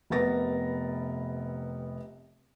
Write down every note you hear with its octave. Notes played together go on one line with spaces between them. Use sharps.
F1 C3 B3 A#4 A6 A#6